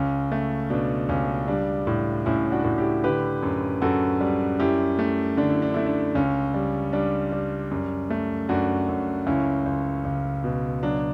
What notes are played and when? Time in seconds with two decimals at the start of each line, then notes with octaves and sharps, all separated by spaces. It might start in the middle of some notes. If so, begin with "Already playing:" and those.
Already playing: C#2 C#4
0.32 A3
0.70 B2 D4
1.09 C#2 C#4
1.48 G3 D4
1.87 A2
2.26 A2 C#4 E4
2.52 D4 F#4
2.64 A2
2.78 E4 G4
3.04 D3 G4 B4
3.43 F#2
3.82 F#2 F#4 A4
4.21 G3
4.59 F#2 E4 G4
4.99 A3
5.37 D3 D4
5.50 E4
5.62 D4
5.74 A3 E4
5.86 D4
6.15 C#2 C#4
6.54 G3
6.93 G3 D4
7.32 G3
7.71 F#2
8.10 A3
8.49 F#2 D4 F#4
8.88 F#2
9.27 C#2 C#4 E4
9.66 C#2
10.05 C#2
10.44 B2
10.83 F#3 D4